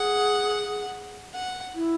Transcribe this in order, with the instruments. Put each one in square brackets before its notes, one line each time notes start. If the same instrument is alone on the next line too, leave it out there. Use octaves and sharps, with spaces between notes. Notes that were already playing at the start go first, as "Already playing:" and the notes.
Already playing: [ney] G#4 [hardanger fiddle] F#5
[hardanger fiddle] F#5
[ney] E4